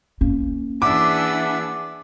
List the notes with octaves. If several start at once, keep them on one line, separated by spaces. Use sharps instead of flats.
A#3 C#4
E3 D4 G#4 E5 F#5 D6 E6